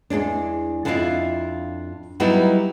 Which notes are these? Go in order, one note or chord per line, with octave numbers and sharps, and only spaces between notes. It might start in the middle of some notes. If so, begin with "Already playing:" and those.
E2 G#2 G#3 D4
F2 D4 E4 F4 D#5 E5
F#3 G3 B3 D#4 E4 F#4